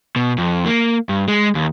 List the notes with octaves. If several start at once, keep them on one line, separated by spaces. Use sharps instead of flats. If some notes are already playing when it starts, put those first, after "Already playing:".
B2
F2
A#3
G2
G#3
D#2